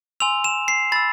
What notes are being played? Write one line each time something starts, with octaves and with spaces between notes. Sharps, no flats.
G#5 C6 E6 F7
E7
C7
B5 E6 A6